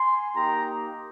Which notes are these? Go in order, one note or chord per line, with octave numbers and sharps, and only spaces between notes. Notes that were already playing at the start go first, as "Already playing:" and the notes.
Already playing: G#5 C6
A#3 D#4 G4 G5 A#5